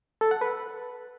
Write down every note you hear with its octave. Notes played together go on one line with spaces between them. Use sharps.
A4
F#5
B4